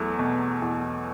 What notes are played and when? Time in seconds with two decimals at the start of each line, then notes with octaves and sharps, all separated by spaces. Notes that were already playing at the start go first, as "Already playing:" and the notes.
Already playing: E2 F#3 A3
0.19 B2
0.62 E2